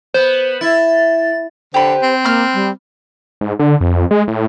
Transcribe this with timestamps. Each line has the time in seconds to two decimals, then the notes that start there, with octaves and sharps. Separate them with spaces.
0.14 B3 C5
0.61 E4 A6
1.74 D3 G4 B4 C5
2.02 C4
2.24 A#3 B5 F6
2.54 G3
3.41 G#2
3.59 D3
3.81 F2
4.11 G#3
4.28 A2